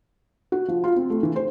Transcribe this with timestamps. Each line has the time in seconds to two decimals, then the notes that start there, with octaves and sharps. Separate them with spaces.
0.52 F#4
0.68 F3
0.84 F4
0.96 C4
1.10 A3
1.23 E3
1.36 C5